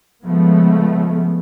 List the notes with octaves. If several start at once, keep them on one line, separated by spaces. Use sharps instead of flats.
C#3 F3 G#3 A3 B3